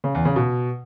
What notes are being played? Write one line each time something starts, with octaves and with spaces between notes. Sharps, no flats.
C#3
E2
C#3
B2